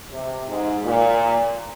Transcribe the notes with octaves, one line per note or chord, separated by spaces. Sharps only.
C3
G#2
A#2